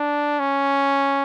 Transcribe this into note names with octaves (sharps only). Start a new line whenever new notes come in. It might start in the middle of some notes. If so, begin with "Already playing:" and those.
Already playing: D4
C#4